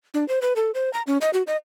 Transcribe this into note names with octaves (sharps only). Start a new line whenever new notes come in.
D4
C5
B4
A4
C5
A#5
C#4
D#5
F#4
D#5